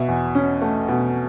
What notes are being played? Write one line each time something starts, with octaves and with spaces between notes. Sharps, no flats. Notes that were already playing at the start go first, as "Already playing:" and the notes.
Already playing: B2 E5
E2
C#4
A3
B2